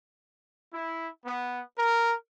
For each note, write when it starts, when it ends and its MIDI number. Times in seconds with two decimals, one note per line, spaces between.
0.73 1.09 64
1.25 1.62 59
1.77 2.15 70